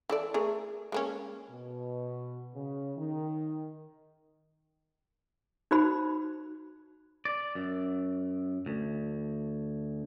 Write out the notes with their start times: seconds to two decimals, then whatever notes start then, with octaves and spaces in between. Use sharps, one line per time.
0.10 E3 A4 D5
0.34 A3 G#4 A#4
0.92 G#3 A#3 C#4
1.50 B2
2.54 C#3
2.96 D#3
5.71 D#4 F#4 C5 B5
7.25 D5
7.55 F#2
8.66 D2